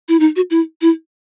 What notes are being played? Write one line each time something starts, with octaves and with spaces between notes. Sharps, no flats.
E4
D#4
F#4
E4
E4